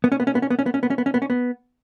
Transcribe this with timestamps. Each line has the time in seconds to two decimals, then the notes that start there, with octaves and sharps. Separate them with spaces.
0.04 B3
0.12 C#4
0.20 B3
0.27 C#4
0.35 B3
0.42 C#4
0.50 B3
0.59 C#4
0.66 B3
0.74 C#4
0.83 B3
0.90 C#4
0.98 B3
1.06 C#4
1.14 B3
1.22 C#4
1.30 B3